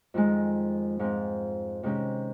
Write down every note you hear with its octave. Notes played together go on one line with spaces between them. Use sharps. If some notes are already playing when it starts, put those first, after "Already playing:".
F2 D#3 G#3
G#2 F3 G#3 C4
C3 D#3 G#3 C#4 G4